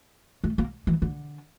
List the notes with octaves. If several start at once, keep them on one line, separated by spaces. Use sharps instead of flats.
A3
A#3
E3
D3